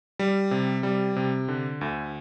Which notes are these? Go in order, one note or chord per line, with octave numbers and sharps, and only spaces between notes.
G3
C3
G3
C3
D3
D2